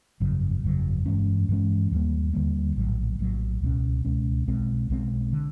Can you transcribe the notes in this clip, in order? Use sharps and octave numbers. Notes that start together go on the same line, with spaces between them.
G1 F2 C#3 F#3
G1 F2 C#3 F#3
G2 E3 G#3 C#4
G2 E3 G#3 C#4
D#2 D3 G3 A#3
D#2 D3 G3 A#3
A#1 A2 F#3
A#1 A2 F#3
C#2 B2 G#3 C#4
C#2 B2 G#3 C#4
B1 B2 G#3 C4
B1 B2 G#3 C4
D3